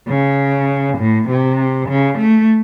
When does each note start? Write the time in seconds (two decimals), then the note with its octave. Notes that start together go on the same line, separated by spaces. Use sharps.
0.08 C#3
0.98 A2
1.29 C3
1.89 C#3
2.18 A3